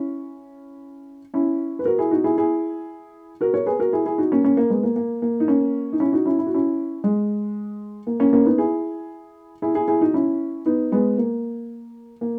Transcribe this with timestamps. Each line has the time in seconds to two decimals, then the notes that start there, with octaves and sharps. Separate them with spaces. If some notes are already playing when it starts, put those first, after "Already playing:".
Already playing: C#4 E4
1.34 C#4 E4
1.79 B4
1.85 F#4 A#4
1.99 E4 G#4
2.11 D#4 F#4
2.24 E4 G#4
2.37 E4 G#4
3.41 F#4 A#4
3.54 A#4 C#5
3.66 G#4 B4
3.79 F#4 A#4
3.93 E4 G#4
4.05 E4 G#4
4.18 D#4 F#4
4.32 A#3 C#4
4.44 A#3 C#4
4.57 A#3
4.70 G#3 B3
4.83 A#3
4.96 A#3
5.22 A#3
5.40 D#4
5.48 A#3 C#4
5.93 D#4
6.00 C#4 E4
6.13 D#4 F#4
6.26 C#4 E4
6.39 E4
6.47 F#4
6.54 C#4 E4
7.04 G#3
8.07 A#3
8.20 A#3 C#4
8.33 A#3 C#4
8.46 B3 D#4
8.58 E4 G#4
9.62 E4 G#4
9.75 E4 G#4
9.88 E4 G#4
10.01 D#4 F#4
10.14 C#4 E4
10.66 B3 D#4
10.92 G#3 B3
11.18 A#3
12.21 A#3